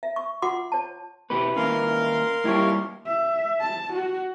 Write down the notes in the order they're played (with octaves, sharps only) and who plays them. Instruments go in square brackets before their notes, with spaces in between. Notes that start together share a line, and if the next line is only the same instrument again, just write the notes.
[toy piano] E5
C#6
F4 F#5 C6 D6
C#5 A5
[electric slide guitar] B2 B3 G4 [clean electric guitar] E4 B4
[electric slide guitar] D#3 A#3 C#4 [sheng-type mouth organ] A#4 F5 C6
[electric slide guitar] G3 A#3 F4 [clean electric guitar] E4 G4 C#5
[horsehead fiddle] E5
A5
F#4